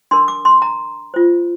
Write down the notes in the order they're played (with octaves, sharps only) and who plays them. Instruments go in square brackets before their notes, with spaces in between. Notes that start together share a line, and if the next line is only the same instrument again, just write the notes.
[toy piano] D4 A#4 C6
D6
C6
A#5
F4 C5